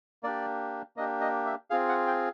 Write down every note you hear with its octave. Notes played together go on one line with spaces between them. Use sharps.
A#3 D4 G4 D5
A#3 D4 G4 D#5
D#5
E5
C4 F4 G#4 F5
F#5
G5